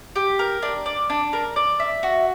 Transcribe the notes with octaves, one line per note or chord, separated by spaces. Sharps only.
G4
A#4
D4
D5
D4
A#4
D5
E5
F#4